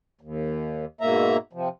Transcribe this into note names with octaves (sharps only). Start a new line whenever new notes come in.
D#2
G#2 B2 A#3 E5 A#5
C3 F3